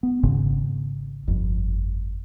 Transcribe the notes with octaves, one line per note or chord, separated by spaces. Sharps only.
B3
G#1 G#2 C#3
G1 F2